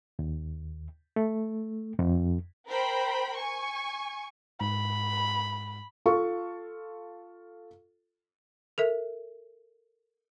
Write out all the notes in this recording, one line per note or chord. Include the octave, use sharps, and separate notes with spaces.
D#2
A3
F2
A#4 C5 G5 B5
G#5 C#6
G#2 B5
F4 A4 F5 C#6
A4 A#4 E5